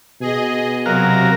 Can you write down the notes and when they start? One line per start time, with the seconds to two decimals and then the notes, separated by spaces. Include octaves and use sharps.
0.21 B2 G#4 D#5
0.86 C3 F#3 F#4 A#4 F5